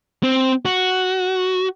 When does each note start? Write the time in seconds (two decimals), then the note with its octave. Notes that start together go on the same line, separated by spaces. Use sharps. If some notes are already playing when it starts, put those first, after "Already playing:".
0.23 C4
0.65 F#4